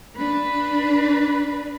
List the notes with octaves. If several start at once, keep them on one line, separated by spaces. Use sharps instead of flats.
D4 B4